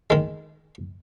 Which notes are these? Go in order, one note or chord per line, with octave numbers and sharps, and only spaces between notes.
D#3 G#3